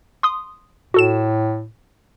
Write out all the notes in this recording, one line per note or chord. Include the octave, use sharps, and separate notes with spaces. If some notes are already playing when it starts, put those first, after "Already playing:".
C6 D#6
A2 F#4 A4 E7